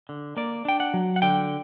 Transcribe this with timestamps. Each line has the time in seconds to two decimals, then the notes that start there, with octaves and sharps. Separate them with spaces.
0.09 D3
0.37 A#3 D5
0.65 D4 G5
0.80 F#5
0.94 F#3
1.16 F#5
1.22 D3 G5